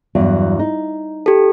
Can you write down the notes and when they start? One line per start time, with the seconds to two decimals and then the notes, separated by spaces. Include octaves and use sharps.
0.15 E2 G2 F#3
0.59 D#4
1.26 G4 A4